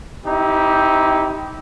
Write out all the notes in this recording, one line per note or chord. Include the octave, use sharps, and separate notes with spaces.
C4 D#4 E4 G4